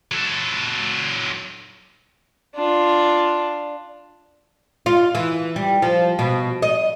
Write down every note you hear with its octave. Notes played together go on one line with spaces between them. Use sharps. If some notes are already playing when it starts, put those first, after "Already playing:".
F#3 A4
D4 F4
F4
E3
G3
F3
B2
D#5